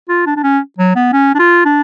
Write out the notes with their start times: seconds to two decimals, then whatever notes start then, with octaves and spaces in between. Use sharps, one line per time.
0.09 F4
0.26 D4
0.36 D4
0.43 C#4
0.78 F#3
0.96 B3
1.13 C#4
1.35 D4
1.39 F4
1.65 D4